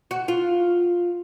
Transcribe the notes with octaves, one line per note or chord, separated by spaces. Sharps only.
F#4
F4